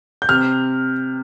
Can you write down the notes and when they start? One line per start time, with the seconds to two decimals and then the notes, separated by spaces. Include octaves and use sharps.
0.22 G6
0.29 C3 F6